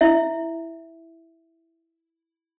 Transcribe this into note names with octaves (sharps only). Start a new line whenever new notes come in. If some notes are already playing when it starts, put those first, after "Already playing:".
E4 E5